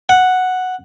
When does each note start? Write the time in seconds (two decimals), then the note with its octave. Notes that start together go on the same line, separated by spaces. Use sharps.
0.09 F#5